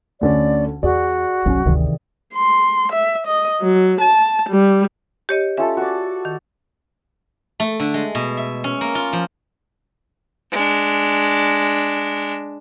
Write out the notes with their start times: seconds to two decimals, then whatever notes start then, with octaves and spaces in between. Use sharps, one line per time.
0.21 D2 D3 C#4 D5
0.83 E2 F#4 G#4 D5
1.46 G1 C2 F#3 C4 C#4
1.66 G1 D2 C3 D#3 E3
2.34 C6
2.92 E5
3.27 D#5
3.62 F#3
4.01 A5
4.50 G3
5.29 G4 C#5 D#5
5.57 C#4 F4 A4 E5
5.77 F#4 D5
6.25 D#3
7.60 A3
7.80 D3
7.94 G#3
8.15 B2
8.37 E5
8.64 C#4
8.81 A#3
8.95 F4
9.13 F3
10.51 G#3 D4